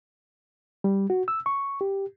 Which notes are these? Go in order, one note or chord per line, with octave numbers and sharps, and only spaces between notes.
G3
F#4
E6
C#6
G4